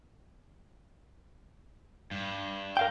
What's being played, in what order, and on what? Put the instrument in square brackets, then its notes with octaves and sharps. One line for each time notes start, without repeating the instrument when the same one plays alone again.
[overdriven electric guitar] G2
[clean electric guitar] A#4 F5 G5